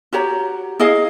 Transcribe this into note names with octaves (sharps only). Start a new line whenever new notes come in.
F#4 G4 C#5 A#5
E4 G#4 D#5 F5